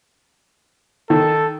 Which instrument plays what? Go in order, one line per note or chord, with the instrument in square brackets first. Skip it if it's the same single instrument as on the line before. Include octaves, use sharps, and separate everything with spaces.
[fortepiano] D#3 [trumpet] A4